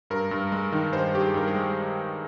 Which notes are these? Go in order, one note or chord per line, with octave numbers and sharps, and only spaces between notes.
G2 A#4
G2
G#3
D#3
G2 C5
G2 G4
G#4
G2 A#4
G#4
G#3